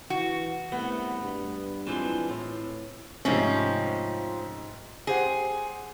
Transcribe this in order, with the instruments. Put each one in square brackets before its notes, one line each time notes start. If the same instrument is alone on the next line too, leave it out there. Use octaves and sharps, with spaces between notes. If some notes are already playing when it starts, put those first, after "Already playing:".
[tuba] E3 [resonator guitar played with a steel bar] F#4
[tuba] C2 [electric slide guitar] A3 [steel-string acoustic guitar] B3
[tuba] G2
[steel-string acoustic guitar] E3 G#3 D4 [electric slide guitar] C4 F4 C5
[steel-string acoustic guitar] A2
[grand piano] G#2 C3 A3 [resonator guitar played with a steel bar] F3 C4 C#4
[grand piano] G4 C5 F#5 [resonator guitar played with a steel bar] G#4